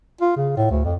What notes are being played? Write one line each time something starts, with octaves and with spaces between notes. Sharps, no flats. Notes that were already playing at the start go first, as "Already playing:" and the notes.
F4
C#3
A2
D2
F2